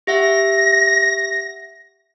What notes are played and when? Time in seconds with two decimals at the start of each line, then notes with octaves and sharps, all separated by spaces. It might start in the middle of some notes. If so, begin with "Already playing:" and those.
0.07 G4 E5 F#5 A#6